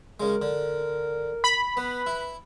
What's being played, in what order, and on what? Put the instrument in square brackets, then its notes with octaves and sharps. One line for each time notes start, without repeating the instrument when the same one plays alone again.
[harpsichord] C#3 G#3 [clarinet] A#4
[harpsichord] D3
[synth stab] B5
[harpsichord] B3 [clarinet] B4
[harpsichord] E4